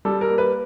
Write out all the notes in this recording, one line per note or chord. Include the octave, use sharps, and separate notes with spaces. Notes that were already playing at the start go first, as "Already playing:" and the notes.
G3 A4
A#4
A#3
B4